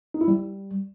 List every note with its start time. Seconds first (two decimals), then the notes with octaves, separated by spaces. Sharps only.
0.14 D#4
0.21 E4
0.28 G3